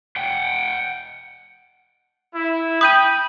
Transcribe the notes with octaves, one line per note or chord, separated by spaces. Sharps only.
F#5 G5
E4
G5 B5 D#6 G6 D#7